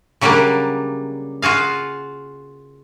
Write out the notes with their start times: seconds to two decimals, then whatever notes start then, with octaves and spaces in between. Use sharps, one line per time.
0.21 C#3 F#3 G3 A#3 D4
1.42 F4 F#4 G#4 F5